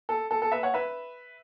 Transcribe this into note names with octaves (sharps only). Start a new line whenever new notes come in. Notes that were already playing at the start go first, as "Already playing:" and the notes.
A4
A4
A4
B4 E5
C#5 F#5
B4 E5